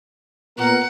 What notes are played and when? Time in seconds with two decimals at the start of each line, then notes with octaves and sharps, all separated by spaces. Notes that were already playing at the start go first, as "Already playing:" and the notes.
0.57 A#2 B3 A#4 F#5